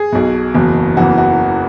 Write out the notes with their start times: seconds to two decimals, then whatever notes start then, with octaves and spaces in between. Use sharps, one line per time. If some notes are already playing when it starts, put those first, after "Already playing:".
Already playing: G#4
0.12 B1 B2
0.54 F#1 E2 B2
0.97 F#1 E2 E3 F#4
1.18 F#4